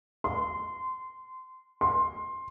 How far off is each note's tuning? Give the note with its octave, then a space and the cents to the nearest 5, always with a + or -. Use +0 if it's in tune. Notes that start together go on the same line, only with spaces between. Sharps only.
C6 -20
C6 +15